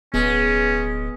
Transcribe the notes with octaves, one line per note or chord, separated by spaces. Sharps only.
D1 G#3 B3 C#4